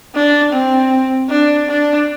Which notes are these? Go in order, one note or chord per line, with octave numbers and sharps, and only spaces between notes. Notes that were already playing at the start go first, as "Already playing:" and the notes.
D4
C4
D4
D4